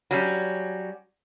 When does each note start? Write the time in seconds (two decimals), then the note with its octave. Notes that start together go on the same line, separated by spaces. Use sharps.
0.11 F#3 G3 C#4